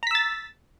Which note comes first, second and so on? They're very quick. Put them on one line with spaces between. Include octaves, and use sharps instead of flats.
A#5 B6 E6 A6